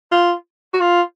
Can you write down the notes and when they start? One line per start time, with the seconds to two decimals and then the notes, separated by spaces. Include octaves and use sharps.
0.12 F4
0.74 F#4
0.81 F4